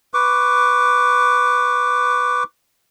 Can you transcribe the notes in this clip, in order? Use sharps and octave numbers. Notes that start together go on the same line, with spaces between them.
B4 C#6 D6